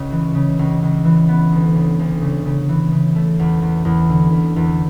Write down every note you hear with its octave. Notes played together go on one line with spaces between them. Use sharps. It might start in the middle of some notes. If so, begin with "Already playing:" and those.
Already playing: C#2 C#3
E3
C#3
C#2
C#2
E3
B3
D2
C#3
D2
C#3
C#3
E3
C#3
A3
E2
E2
E2
D3
E2
E2